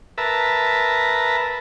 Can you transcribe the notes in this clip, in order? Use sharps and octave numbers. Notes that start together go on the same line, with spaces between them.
A#4 B4 E5 A5